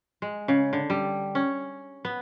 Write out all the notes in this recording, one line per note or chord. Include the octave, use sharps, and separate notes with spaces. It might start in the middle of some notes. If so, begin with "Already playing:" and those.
G#3
C#3
D3
G3
C#4
B3